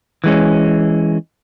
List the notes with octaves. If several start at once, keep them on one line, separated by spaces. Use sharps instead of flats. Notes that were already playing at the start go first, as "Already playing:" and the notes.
E3 G#3 C#4